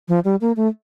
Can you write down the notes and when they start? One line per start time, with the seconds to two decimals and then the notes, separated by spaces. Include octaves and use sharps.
0.08 F3
0.25 G3
0.41 A#3
0.56 A3